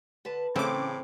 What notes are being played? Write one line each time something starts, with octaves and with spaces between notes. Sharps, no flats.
D3 B4 A5
A2 C#3 E3 A3 C4 D6